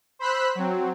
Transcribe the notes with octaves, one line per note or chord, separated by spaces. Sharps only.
C5 B5 E6 F#6 B6
F#3 C4